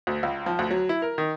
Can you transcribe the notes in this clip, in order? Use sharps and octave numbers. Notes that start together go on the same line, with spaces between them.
D2
C#2
F3
D2
F#3
E4
A#4
D#3